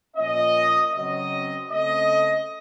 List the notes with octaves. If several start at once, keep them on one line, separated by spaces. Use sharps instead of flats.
A#2 F3 A#3 C#4 D#5
C#3 F#3 C4 D#5
C#3 A3 C4 D#5